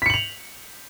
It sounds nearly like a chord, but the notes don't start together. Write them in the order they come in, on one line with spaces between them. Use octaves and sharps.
B6 C#7 F#7 F7